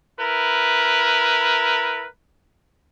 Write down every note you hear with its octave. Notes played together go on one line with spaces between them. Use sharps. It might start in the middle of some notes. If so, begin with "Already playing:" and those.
E4 A#4 B4